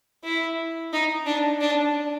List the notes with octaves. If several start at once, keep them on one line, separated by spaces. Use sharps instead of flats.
E4
D#4
D4
D4